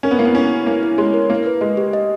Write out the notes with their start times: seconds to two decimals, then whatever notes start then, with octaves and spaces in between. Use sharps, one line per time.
0.03 C#4 A#4
0.11 B3
0.19 A#3 E4
0.25 B3
0.35 C#4 E4
0.50 E4
0.66 A#3 E4
0.83 E4
0.98 G#3 C#5
1.14 A#4
1.30 A#3 E4
1.46 B4
1.61 G#3 D#5
1.77 G4
1.93 D#5